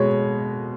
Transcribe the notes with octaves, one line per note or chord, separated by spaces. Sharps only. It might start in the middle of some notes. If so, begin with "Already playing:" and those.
Already playing: B2 G#3 C#5